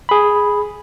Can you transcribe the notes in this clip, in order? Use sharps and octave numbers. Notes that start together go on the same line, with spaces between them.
G#4 B5